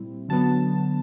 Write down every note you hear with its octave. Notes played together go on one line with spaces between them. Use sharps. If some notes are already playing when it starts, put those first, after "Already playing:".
Already playing: A#2 G3 C4 E4
D3 F#3 B3 A5